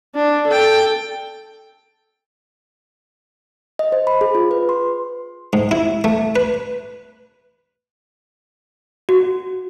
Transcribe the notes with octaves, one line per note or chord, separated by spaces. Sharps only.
D4
A4 G5
D#5
C5
B5
G#4
F4
B4
C6
G#2
E4
A3
B4
F#4